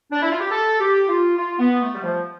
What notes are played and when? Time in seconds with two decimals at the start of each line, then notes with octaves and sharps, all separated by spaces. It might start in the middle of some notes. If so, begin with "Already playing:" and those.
0.11 D4
0.21 E4
0.31 F4
0.40 G4
0.50 A4
0.80 G4
1.07 F4
1.37 F4
1.59 B3
1.81 A3
1.95 G3
2.03 F3